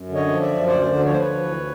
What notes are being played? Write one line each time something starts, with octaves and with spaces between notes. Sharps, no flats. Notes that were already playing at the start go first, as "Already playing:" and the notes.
Already playing: F#2
D3
C#5 D#5
F3
D5 E5
F#2
D2 C5 D5
D3
F3 C#5
C5
B4 C#5
D2
E3